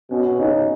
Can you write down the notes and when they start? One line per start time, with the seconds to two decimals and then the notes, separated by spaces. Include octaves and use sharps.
0.11 B2 C#4
0.39 C#3 D#4